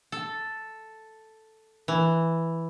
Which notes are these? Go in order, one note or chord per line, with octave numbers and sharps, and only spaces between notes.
A4
E3